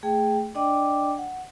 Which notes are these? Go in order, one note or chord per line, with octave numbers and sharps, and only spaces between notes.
A3 G#4 G5
D4 D5 D#5 G5 D6
F#5